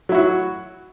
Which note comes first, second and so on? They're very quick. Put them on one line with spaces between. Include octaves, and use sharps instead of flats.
F#3 E4 F#4